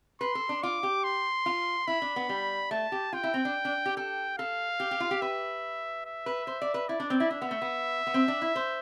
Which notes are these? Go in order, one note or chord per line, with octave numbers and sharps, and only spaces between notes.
B4 C6
A4
D4
F4 D6
G4
C6
F4
E4 B5
D4
B3
G3
A3 A5
G4
F4 G5
E4
C4
D4
D4
G4
A4 G5
A4 F5
G4
G4
F4
G4
B4 E5
E5
B4
C5
D5
B4
E4 D5
D4
C4
E4
D4 E5
B3
A3
B3
B3
C4
D4
E4
C5